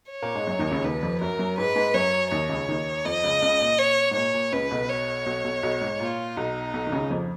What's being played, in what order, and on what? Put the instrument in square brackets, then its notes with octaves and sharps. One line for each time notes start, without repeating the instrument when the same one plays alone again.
[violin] C#5
[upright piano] A#2 A#3
G#2 G#3
F#2 F#3
D#2 D#3
C#2 C#3
[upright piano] D#2 D#3 [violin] B4
[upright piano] F2 F3
[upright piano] F#2 F#3 [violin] A#4
[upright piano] F#2 F#3
[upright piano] G#2 G#3 [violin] B4
[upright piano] G#2 G#3
[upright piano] F#2 F#3 [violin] C#5
[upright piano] D#2 D#3 [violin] C#5
[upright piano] C#2 C#3
D#2 D#3
[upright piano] F2 F3 [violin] D#5
[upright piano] C#2 C#3
C#2 C#3
A#2
[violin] C#5
[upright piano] G#2
[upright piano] A#2 [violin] C#5
[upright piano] A#2
[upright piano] C#2 C#3 [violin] B4
[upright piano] B1 B2
[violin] C#5
[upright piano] B1 B2
B1 B2
B1 B2
G#2
[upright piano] A#2 [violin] F4
[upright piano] B1 B2 [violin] D#4
[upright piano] B1 B2
D#3
C#2 C#3
F2 F3